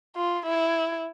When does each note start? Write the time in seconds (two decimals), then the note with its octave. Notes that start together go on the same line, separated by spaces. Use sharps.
0.16 F4
0.45 E4